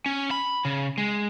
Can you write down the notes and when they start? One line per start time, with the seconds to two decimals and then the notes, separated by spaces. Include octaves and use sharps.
0.06 C#4
0.31 B5
0.65 C#3
0.98 G#3